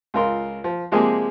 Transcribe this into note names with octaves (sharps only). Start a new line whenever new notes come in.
C#2 F4 A#4 C6
F3
C3 F3 G#3 A#3 G4 G#4